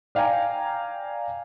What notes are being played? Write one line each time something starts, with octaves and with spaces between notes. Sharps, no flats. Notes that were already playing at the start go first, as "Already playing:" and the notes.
D5 F5 G5 G#5 A#5